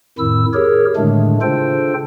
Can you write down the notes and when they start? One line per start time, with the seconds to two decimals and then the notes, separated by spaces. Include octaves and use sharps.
0.18 F2 A2 D#3 E4 E6
0.54 G4 G#4 A#4 C#5
0.96 A2 D3 D#3 G#3 A3 D4
1.42 C#3 D4 F4 A4 C5 G5